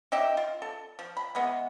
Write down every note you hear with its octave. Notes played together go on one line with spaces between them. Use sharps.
D#4 G4 E5 G5
F4
A4
F3
B5
E3 G#3 B3